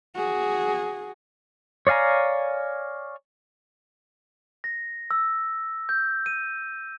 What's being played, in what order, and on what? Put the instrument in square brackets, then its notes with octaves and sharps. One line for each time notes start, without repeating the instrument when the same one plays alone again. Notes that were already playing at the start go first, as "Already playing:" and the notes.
[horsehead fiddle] F#4 G#4
[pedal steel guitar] C#5 D5 F5 G#5 A#5
[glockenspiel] A#6
E6
G6
D#7